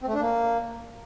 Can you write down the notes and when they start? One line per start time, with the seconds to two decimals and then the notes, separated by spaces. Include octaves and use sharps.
0.01 C4
0.08 A3
0.14 D4
0.21 A#3